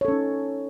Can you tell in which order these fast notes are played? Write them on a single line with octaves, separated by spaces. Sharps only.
C#5 A4 C#4 D#4